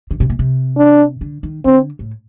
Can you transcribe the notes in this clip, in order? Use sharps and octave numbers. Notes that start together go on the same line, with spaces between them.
D3
C3
A#2
C3
D4
D3
D#3
D3 C4
A2